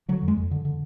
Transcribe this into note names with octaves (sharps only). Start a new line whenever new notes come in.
D3 F#3
F2
G#3
F2
D3
D3